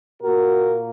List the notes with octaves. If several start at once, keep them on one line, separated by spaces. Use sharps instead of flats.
A#2 A#3 F#4 A#4